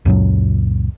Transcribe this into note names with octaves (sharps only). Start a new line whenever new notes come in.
C#2 F#2 A#2 F#3